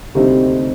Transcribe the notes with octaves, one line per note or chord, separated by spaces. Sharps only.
D2 C3 G3 C4 D#4